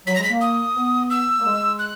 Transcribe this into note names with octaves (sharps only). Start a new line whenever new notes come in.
F#3 B6
G#3 A#6
B6
A#3
D#6
B3
E6
A#3
G#3
F#6